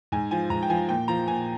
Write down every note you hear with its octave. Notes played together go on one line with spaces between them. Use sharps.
G#2 G#5
F3 G#5
G#2 A#5
G5
F3 G#5
A#2 G5
F3 A#5
A#2 G#5